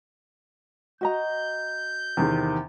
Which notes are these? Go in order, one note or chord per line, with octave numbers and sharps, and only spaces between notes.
F#4 D#5 A#5 G6
E2 C3 D#3